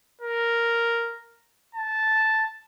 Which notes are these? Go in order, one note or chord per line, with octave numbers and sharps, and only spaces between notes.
A#4
A5